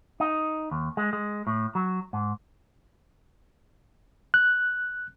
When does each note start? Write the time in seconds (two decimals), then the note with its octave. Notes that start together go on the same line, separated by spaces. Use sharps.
0.20 D#4
0.71 D#2
0.97 G#3
1.13 G#3
1.47 A2
1.75 F#3
2.13 G#2
4.34 F#6